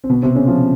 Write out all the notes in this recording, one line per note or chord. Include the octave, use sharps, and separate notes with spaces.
C4
B2 B3
C3 C4
C#3 C#4
F3 F4